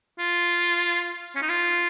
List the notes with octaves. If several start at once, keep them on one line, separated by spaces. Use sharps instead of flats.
F4
C#4
D#4
F4